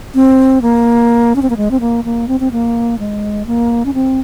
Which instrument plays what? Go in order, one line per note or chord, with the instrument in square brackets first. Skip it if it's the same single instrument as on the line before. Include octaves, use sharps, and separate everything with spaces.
[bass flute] C4
A#3
C#4
C4
A#3
G#3
C4
A#3
A#3
C4
C4
A#3
G#3
A#3
C#4
C4